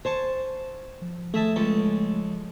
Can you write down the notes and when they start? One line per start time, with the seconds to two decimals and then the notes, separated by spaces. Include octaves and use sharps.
0.05 C5 G#5 A5 C#6
1.02 F3
1.34 A3 G#4 E5 A5
1.56 C#2 G#3 C#4 A4